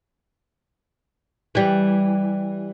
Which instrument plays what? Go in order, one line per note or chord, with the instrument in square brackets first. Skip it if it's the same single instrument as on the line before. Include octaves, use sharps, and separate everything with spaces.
[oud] E3 G3